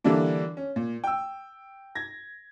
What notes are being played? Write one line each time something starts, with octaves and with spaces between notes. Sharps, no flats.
D3 E3 G3 A#3 D4
C#4
A#2
G5 E6
G#6 A#6